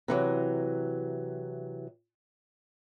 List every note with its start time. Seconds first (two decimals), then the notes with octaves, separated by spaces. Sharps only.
0.08 C3 E3 F#3